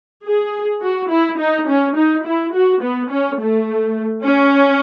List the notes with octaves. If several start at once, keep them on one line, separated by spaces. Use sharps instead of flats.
G#4
F#4
E4
D#4
C#4
D#4
E4
F#4
B3
C#4
A3
C#4